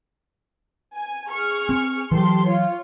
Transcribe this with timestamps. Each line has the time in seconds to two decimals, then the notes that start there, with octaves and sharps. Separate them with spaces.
0.95 G#5
1.31 G#4 C#6 F6
1.69 C4
2.12 E3 F#3 G4 A4 C6
2.46 F4 C#5